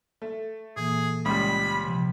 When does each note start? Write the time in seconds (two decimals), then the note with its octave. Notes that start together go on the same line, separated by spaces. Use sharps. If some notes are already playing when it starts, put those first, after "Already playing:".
0.22 A3
0.76 A#2 E3 A#3 G#4
1.25 C#2 G3 B5 D#6
1.85 C3 F3